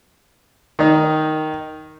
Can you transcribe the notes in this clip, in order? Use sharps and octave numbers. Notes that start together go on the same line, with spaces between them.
D#3 D#4